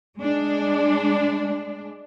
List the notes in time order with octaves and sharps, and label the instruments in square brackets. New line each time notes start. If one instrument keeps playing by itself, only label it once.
[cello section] G#3 D4